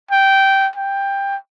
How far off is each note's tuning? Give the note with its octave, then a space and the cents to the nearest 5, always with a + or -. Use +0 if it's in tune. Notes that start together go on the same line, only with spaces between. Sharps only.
G5 -10
G5 +15